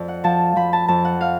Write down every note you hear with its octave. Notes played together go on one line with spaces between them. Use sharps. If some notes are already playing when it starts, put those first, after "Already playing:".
Already playing: F2 D5
F#5
F3 A5
F3 B5
A5
F2 A5
F#5
F5